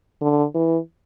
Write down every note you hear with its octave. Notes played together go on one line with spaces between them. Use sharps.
D3
E3